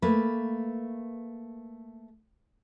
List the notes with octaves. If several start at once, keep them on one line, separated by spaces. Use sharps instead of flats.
A3 A#3 B4